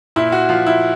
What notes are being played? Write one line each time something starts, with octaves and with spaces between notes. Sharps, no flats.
A#2 E4
F#4
F3 F4
E4